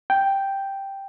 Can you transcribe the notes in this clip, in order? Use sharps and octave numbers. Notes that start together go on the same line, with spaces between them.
G5